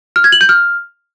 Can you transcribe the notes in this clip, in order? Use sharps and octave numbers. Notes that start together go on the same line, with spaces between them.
F6
G#6
F#7
G6
F6